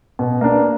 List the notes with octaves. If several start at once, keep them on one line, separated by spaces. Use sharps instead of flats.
B2
A#3 D4